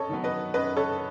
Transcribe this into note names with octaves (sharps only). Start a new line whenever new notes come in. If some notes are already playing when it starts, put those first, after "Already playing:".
Already playing: F#2 A4 C#5 D#5
D#3 F#3 B3
B4 D#5
F#2 B4 D#5
A4 C#5